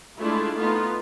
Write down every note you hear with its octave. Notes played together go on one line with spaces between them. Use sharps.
G#3 A3 D4 E4 F4
A3 B3 D#4 F4